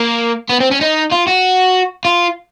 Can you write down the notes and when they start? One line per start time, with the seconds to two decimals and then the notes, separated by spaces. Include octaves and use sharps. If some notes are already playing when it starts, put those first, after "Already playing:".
Already playing: A#3
0.49 B3
0.60 C4
0.71 C#4
0.81 D#4
1.12 F4
1.28 F#4
2.05 F4